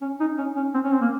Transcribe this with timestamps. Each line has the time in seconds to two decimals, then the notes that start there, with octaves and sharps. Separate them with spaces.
0.01 C#4
0.20 D#4
0.38 C#4
0.56 C#4
0.74 C4
0.84 C#4
0.93 C4
1.01 A#3